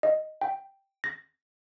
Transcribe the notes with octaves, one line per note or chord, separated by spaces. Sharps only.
D#5
G5
A#6